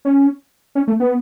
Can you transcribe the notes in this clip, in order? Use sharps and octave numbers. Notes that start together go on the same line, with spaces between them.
C#4
C#4
A3
B3